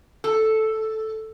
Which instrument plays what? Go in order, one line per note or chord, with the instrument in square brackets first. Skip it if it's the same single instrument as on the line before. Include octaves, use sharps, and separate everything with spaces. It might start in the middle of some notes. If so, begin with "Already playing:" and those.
[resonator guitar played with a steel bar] A4